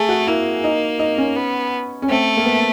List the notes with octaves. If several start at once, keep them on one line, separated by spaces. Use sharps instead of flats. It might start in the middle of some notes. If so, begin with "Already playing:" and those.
Already playing: A3 G#4
F#4
A#3 E4
D#4
D#4
C#4
B3
C#4
A3 C4
A#3
B3